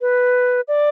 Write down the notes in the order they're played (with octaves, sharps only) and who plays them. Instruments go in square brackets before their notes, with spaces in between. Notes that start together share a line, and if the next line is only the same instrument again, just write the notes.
[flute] B4
D5